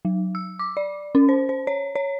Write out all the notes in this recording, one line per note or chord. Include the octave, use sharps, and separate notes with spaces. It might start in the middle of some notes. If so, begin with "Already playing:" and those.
F#3
E6
D6
D5
C#4
C5
C5
C#5
C#5